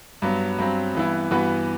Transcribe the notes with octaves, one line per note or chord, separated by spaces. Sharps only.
G2 F#3 B3
G2 F#3 C4
G2 E3 B3 E4
G2 E3 B3 F#4 B4